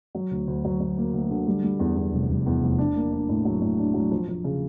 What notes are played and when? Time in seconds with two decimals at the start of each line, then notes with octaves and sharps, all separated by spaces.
0.15 F#3
0.31 D2
0.48 D2
0.65 F#3
0.80 F#3
0.98 A#3
1.14 D2
1.31 D3
1.47 G3
1.64 G3
1.79 E2
1.96 E2
2.13 F1
2.30 F1
2.46 E2
2.62 F1
2.79 D4
2.96 A#3
3.12 D4
3.29 A2
3.45 F#3
3.61 A2
3.79 D4
3.94 F#3
4.11 F3
4.28 F3
4.44 C#3